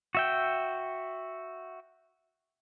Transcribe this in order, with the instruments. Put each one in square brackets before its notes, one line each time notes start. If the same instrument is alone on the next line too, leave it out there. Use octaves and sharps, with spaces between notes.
[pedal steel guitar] F#4 E5 G5